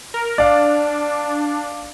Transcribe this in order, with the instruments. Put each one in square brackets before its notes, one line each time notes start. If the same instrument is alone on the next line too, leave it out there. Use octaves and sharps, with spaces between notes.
[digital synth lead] A#4
[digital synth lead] D4 [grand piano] D5 F5